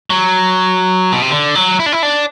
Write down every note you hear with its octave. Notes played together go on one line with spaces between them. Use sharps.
F#3
B2
C3
D3
F#3
E4
D4
E4
D4